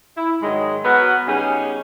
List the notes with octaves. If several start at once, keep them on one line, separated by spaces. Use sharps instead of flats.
E4
G#2 D#3 F#3 G#3
F#3 B3 F#4 A#4 B4
C#3 G3 B3 C#4 D#4 G#4